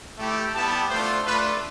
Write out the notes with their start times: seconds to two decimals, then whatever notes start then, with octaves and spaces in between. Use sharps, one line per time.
0.19 A3 E4 G4
0.54 G3 B3 E4 G4 A5
0.90 A3 D4 F4 C5
1.25 A3 D4 F4 B4